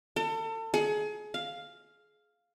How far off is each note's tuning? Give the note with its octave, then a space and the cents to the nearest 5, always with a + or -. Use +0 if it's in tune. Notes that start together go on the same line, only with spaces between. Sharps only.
A4 +35
G#4 +30
F5 +0